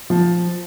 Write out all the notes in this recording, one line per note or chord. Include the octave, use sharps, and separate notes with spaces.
F3